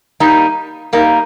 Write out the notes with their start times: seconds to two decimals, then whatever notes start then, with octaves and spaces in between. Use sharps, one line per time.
0.20 G3 A#3 D#4
0.93 G3 A#3 D#4